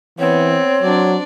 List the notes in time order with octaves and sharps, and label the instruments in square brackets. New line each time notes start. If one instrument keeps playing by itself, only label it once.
[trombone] E3 [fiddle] B3 [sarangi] C4 [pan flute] C#5
[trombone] F#3 [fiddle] D4 D5